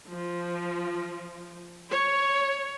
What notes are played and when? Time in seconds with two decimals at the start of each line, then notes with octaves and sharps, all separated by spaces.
0.12 F3
1.91 C#5